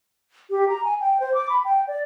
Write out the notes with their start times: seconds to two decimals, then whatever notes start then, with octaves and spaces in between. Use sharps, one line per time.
0.50 G4
0.69 A#5
0.84 G#5
1.00 G5
1.20 C5
1.34 D6
1.49 B5
1.65 G5
1.87 D5